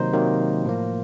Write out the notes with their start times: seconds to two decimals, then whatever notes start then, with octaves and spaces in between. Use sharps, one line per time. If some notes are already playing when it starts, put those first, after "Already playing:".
Already playing: C3 D#3 F#3 A#3 D#4 C5
0.13 C3 D#3 F#3 A#3
0.65 A2 F3 A#3